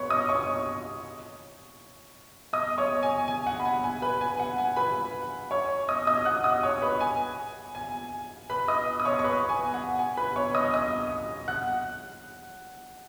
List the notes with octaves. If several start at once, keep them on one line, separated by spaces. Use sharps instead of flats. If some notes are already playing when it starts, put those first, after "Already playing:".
Already playing: B4 C#5 C#6
D#5 D#6
C#5 C#6
D#5 D#6
C#5 C#6
G#5
G#5
F#5
B5
G#5
G#5
B4 B5
G#5
F#5
G#5
B4 B5
C#5 C#6
D#5 D#6
D#5 D#6
F#5 F#6
D#5 D#6
C#5 C#6
B4 B5
G#5
G#5
B4 B5
D#5 D#6
D#6
C#5 C#6
C#6
B4 B5
G#5
F#5
G#5
B4 B5
C#5 C#6
D#5 D#6
D#5 D#6
F#5 F#6